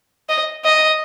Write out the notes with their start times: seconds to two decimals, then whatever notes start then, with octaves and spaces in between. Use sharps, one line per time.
0.29 D#5
0.65 D#5